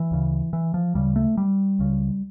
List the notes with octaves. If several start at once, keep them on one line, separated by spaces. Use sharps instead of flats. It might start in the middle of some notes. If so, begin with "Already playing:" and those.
Already playing: E3
D2 C#3
E3
F3
D2 C#3 G3
A3
G3
C#2 C#3